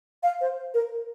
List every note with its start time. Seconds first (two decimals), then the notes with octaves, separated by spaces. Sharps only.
0.23 F5
0.41 C5
0.74 A#4